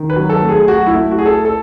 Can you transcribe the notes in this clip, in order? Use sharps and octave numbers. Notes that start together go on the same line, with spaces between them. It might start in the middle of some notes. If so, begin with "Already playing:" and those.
Already playing: D#3
B4
F#3
A4
A3
G#4
F#3 F#4
E4
A3
F#4
E4 G#4
A4
A4